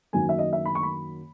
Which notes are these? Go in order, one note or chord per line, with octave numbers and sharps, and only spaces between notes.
F#2 D#3 F#3 A#3 G#5
E5
D#5
E5
B5
C#6
B5